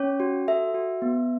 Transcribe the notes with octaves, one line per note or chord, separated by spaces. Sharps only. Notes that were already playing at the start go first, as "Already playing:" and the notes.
Already playing: C#4 C#5
F#4
A4 E5
F#4
B3